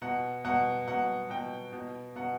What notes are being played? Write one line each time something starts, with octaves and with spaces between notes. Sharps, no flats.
B2 F#5
B2 F#5
B2 F#5
B2 G5
B2
B2 F#5